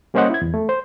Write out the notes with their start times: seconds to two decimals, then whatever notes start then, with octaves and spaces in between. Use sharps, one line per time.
0.14 G3 A#3 C#4 C5 D#5 F#5
0.30 E4 G#6
0.42 E2
0.54 A3
0.69 C5